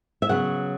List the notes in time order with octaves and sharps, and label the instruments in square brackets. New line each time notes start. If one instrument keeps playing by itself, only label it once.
[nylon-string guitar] E5
C#3 F#3 B3 F#5